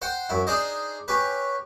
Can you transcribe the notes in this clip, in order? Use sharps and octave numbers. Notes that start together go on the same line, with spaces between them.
C5 F#5 G5
F#2 E4
D4 D#4 G#4 C5 D#5
C#4 G4 B4